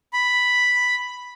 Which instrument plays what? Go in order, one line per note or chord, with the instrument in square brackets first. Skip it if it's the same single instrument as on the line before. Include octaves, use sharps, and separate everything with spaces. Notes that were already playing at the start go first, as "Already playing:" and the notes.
[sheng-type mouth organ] B5